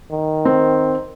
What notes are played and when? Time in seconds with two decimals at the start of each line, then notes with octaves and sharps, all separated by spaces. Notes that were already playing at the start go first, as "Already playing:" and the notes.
0.11 D#3
0.45 C4